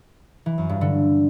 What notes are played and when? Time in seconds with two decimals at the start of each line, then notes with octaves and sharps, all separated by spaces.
0.46 E3
0.58 F#2
0.69 G2
0.81 D3